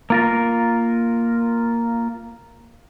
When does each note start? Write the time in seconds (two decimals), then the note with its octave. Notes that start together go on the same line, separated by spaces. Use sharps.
0.10 A#3 F4 A#4